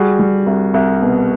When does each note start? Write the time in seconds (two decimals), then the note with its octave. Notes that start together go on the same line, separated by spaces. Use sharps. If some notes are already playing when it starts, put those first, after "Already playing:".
Already playing: G3 F#4 G#4
0.19 G3
0.46 C2
0.74 C2
1.02 B2